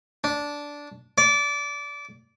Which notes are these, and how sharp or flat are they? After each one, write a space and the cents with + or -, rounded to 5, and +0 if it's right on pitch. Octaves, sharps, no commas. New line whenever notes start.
D4 -10
D5 -20